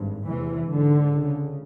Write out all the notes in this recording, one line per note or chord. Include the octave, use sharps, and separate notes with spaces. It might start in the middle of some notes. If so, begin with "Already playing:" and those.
Already playing: G#1 G2
F1 E2 C3 E3
G#1 G#2 D3
C#2 C#3